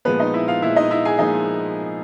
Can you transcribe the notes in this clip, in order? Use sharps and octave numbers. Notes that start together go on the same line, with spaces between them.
A#2 F3 G#3 B3 B4
D#4 D#5
E4 E5
F4 F5
A#2 F3 G#3 E4 E5
D#4 D#5
E4 E5
G#4 G#5
A#2 F3 G#3 D#4 D#5